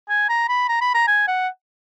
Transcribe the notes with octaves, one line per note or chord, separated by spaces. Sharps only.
G#5
A#5
B5
A#5
B5
A#5
G#5
F#5